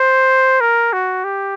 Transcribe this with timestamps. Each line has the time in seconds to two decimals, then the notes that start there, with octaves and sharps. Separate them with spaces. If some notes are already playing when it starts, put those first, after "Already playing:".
Already playing: C5
0.60 A#4
0.93 F#4
1.24 G4